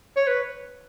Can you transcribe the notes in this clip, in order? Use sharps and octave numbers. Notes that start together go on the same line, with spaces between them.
C#5
B4